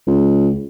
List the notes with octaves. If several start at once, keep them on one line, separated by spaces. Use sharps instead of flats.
C#2